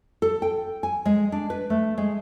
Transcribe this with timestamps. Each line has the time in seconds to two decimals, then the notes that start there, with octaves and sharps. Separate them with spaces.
0.22 A4
0.42 G5
0.83 G#5
1.05 G#3
1.32 D4
1.50 B4
1.70 A3
1.98 G#3